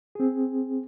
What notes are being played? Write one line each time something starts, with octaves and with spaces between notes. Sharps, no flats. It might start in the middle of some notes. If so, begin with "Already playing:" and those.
C4 G#4